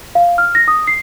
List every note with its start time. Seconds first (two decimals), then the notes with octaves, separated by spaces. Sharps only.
0.15 F5
0.38 F6
0.55 A#6
0.68 D#6
0.87 C7